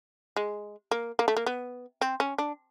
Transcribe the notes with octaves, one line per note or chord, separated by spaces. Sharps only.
G#3
A#3
A#3
A3
A#3
B3
C4
C#4
D4